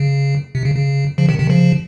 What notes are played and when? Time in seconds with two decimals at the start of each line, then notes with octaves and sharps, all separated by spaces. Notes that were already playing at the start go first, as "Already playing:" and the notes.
Already playing: C#3
0.55 C3
0.65 C#3
0.76 C#3
1.18 C#3 F3
1.29 C3 D#3
1.39 C3 D#3
1.50 C#3 F3